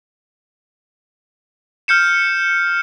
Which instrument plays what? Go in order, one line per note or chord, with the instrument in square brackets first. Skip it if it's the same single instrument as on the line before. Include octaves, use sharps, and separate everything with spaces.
[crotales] F6 G6 C#7 E7